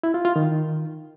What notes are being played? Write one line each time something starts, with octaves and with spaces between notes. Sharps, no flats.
E4
F4
F4
D#3